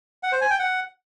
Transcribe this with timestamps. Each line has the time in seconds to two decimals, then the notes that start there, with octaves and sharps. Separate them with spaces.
0.23 F#5
0.32 C5
0.41 G#5
0.50 G5
0.59 F#5